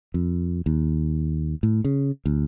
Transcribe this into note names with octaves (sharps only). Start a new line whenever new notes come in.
F2
D#2
A2
C#3
D2